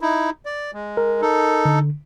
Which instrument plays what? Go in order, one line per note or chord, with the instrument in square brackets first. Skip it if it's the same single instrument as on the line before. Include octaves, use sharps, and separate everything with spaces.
[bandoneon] D#4 E4
D5
G#3
[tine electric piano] A#4
[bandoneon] D#4 A4
[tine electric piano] D3